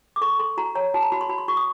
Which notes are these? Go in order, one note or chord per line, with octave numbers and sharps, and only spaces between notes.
D6
A4 C#6
A4 C6
F#4 A#5
C#5 A#5
F#4 A5
A#5
F#4 B5
C6
F#4 B5
C6
F#4 C#6
D#6